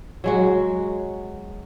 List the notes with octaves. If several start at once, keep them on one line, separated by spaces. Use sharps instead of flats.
F#3 G#3 F#4